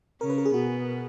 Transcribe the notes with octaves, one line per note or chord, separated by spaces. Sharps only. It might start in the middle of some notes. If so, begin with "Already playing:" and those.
C#3 C#4 A#4
B4
A#4
G#4
B2 B3 F#4